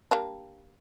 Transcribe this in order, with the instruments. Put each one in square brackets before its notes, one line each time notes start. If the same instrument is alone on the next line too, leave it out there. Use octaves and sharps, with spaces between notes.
[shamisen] G3 A#3 D4